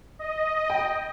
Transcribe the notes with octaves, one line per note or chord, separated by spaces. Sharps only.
D#5
G5